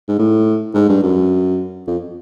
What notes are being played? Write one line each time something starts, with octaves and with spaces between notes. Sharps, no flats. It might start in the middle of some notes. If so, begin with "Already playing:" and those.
G#2
A2
G#2
G2
F#2
F2